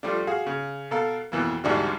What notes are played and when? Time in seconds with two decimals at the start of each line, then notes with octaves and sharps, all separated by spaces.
0.03 F3 G3 A3 D4
0.27 F#4 G#4 F5
0.46 C#3
0.91 B2 A4 A#4 F5
1.32 F2 B2 E3 A#3
1.64 A1 D2 G#2 G3 D4 F#4